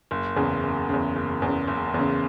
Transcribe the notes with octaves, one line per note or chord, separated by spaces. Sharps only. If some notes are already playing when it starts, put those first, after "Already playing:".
F#1
E2 C#3
F#1
E2 C#3
F#1
E2 C#3
F#1
E2 C#3